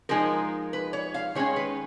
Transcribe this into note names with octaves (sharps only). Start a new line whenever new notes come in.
F3 G#3 D#4 A#4
B4
C#5
F5
D#3 G#3 C#4 C#5
B4